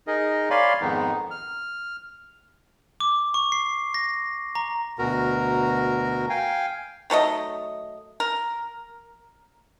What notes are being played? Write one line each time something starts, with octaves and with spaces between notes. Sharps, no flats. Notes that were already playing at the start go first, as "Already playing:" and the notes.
D#4 G#4 A#4 D#5
C#5 D5 F5 G#5 B5 C6
F2 G#2 D#3 G#3 B3 D#4
F6
D6
C#6
C7
A#6
A#5
D2 B2 F#4 A#4 A#5
F5 G5 G#5
D#3 F#3 A3 D#5
A#4